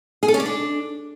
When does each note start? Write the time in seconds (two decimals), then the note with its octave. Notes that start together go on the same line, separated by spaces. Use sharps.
0.23 G#4
0.28 A4
0.34 C#4
0.40 D5
0.45 D4